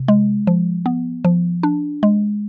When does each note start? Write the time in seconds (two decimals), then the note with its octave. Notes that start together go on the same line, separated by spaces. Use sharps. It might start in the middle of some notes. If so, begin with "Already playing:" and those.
Already playing: C3
0.08 G#3
0.47 F3
0.86 B3
1.25 F3
1.63 D4
2.03 G#3